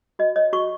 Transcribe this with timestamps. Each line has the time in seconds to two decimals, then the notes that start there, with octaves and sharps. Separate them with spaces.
0.19 F#4 D#5
0.36 C#5 D#5
0.53 F#4 C#6